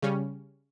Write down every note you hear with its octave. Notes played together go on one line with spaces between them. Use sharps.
C#3 G3 C#4